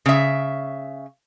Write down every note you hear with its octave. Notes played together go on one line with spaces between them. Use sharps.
C#3 E5